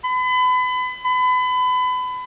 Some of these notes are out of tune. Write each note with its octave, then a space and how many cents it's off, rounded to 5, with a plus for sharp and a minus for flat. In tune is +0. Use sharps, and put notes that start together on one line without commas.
B5 +35
B5 +30